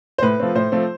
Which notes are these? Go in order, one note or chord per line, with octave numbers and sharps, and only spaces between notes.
C5
A2 B4
F3 A3 C4
A2 C5
F3 A3 C4